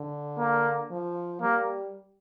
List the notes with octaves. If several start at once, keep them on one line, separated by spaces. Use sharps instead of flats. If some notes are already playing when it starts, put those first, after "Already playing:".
Already playing: D3
A#3
F3
G3 A#3